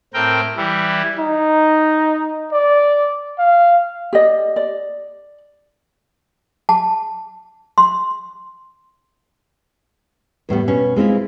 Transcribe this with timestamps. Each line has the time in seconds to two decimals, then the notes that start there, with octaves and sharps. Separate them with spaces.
0.14 A2 C4 A#4 G5
0.57 E3 G3 E4
1.19 D#4
2.52 D5
3.39 F5
4.13 G4 D5 D#5
4.56 D5
6.69 A5
7.78 C6
10.49 E2 A2 G3 B3
10.68 B2 C#4
10.96 G#3 C4 E4 F4